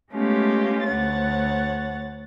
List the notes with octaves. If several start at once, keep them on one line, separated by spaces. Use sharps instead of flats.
G#3 A3 B3 C#4 F4 G4
D2 C#5 F#5 A6